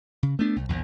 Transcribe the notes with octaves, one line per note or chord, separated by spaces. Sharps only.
C#3
A3 B3 D4
C2
A#1 E2